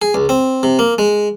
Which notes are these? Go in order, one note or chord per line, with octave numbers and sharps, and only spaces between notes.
G#4
C#2
C4
C3
A#3
G#3